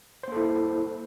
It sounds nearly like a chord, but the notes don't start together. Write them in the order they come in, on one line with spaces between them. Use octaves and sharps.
C5 A#3 A4 E4